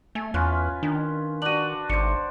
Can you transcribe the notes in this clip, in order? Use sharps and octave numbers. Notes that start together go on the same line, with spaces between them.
A3 G#5
E2 C#4 F4 B4
D#3 D4
D4 F#4 D#7 F#7
G#1 D4 C5 C#7